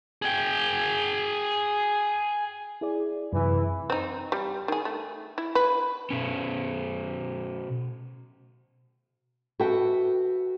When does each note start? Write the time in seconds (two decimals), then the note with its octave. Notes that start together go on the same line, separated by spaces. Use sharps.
0.22 G#4 G5
2.81 E4 G#4 D5
3.33 F#2 C3 E3 E4
3.90 C4 D#4
4.32 G3
4.68 D#3 G#4
4.85 A3
5.38 E4
5.55 B4
6.10 B2 C#4
9.60 F#4 A4 B4 E5 G5